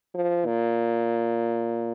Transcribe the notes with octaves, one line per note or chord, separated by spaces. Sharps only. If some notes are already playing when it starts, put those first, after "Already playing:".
F3
A#2